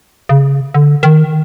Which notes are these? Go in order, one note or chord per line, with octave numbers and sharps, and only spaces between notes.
C#3
D3
D#3